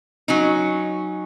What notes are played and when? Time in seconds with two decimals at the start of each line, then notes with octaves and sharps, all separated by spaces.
0.28 F#3 C#4 D#4